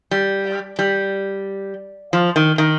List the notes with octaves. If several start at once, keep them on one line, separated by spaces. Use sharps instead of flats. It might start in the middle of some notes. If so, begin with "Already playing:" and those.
G3
G3
F3
D#3
D#3